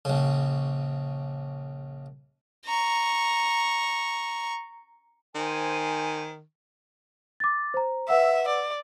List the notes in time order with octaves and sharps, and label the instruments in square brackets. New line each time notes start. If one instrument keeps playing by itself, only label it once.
[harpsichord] A#1 C#3
[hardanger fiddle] A#5 C#6
[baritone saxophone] D#3 [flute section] C5 G#5
[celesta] D6 A6
C5 A#5
[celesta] B4 F#5 E6 [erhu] E5
[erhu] D5